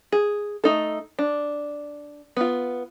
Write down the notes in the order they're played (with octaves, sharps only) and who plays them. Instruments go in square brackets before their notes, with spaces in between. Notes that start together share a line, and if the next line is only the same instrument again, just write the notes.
[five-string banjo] G#4
A3 D#4 A4
D4
B3 F4